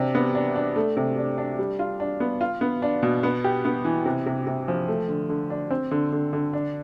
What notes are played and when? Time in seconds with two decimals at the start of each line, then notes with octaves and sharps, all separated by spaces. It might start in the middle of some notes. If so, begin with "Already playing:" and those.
Already playing: C3 D4
0.15 B3
0.35 D4
0.56 D4
0.76 A3
0.97 C3
1.18 D4
1.38 D4
1.59 G3
1.79 F4
2.00 D4
2.20 B3
2.41 F4
2.61 B3
2.82 D4
3.03 B2
3.23 B3
3.44 G4
3.65 B3
3.85 E3
4.06 C3
4.26 C3
4.47 C3
4.68 F3
4.88 A3
5.09 D3
5.29 D3
5.50 D4
5.71 C4
5.91 D3
6.12 D3
6.33 D3
6.53 D4